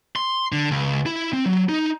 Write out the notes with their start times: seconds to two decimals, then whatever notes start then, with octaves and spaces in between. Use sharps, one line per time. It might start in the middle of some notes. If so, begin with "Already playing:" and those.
0.16 C6
0.52 D3
0.71 C#2
1.06 E4
1.33 C4
1.46 F#3
1.69 D#4